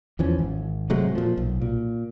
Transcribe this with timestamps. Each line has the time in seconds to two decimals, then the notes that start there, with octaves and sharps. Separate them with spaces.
0.19 E2 E3 F3 C#4
0.39 G#1
0.90 C3 F#3 G#3 A3
1.15 A#2 F3
1.37 B1
1.62 A#2